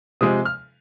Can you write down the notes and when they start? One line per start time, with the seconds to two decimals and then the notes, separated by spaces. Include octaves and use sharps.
0.21 C3 F3 G#3 D#6
0.45 F6